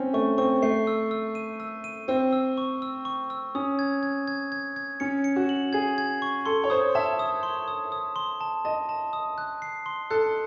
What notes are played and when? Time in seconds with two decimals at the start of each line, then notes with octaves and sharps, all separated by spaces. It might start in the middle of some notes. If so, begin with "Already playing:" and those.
Already playing: C4 C#4
0.14 A3 C#6
0.38 C4 C#6
0.62 A3 C7
0.87 E6
1.11 E6
1.35 D#7
1.60 E6
1.84 D#7
2.08 C4 E6
2.33 E6
2.58 C#6
2.82 E6
3.05 C#6
3.30 E6
3.55 C#4 D#6
3.79 G#6
4.03 G#6
4.28 G#6
4.52 G#6
4.76 G#6
5.00 C#4 C#7
5.24 C#7
5.36 F#4
5.49 F#7
5.73 G#4 G#6
5.98 G#6
6.22 C#6
6.46 A4 C6
6.64 C#5
6.70 C5 D#6
6.95 E5 A5
7.19 D#6
7.43 C6
7.68 D#6
7.92 D#6
8.16 C6
8.41 A5
8.65 D#5 A5
8.89 A5
9.13 D#6
9.38 F#6
9.62 C7
9.86 C6
10.10 A4 F#6